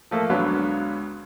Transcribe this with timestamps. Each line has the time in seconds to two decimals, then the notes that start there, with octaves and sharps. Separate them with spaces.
0.11 F3 A3 A#3
0.30 C#2 D3 F#3 B3